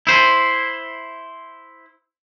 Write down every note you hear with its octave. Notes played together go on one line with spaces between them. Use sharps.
E4 C5